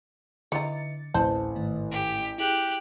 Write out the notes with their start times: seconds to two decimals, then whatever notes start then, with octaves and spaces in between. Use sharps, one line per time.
0.52 D3 E3 D#4 A6 C#7
1.14 A1 D2 C4 C5 A5
1.55 G#2 D#3 A3
1.91 G4
2.38 E4 G4 G#4 F#6 G6